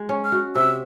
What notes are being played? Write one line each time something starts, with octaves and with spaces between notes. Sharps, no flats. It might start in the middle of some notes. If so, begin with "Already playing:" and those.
Already playing: G#3
C#4
F6
F#4
C3 E6